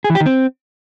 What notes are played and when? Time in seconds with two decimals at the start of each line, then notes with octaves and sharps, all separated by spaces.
0.04 G#4
0.10 E3
0.15 G4
0.20 D#3
0.26 C4